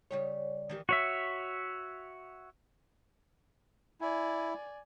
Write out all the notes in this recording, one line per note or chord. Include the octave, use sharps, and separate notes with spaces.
C#3 G3 C#5
D#3 E3 G4
F#4 C#5 E5
E4 D5 G#5